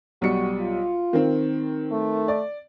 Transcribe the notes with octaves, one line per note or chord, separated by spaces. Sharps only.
B1 G3 F#4 C#7
F4
D#3 C4
A3
D5